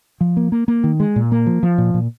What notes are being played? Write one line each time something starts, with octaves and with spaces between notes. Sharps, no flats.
F3
A#3
A#3
A#3
D#3
G#3
A#2
A#3
F3
F3
A#2
A#2